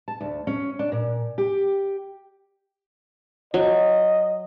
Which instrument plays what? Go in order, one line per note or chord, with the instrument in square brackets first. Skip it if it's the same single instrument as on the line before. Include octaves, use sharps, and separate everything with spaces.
[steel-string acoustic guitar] A5
D2
C#4
D4
A#2
G4
[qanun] F#3 [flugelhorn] D#5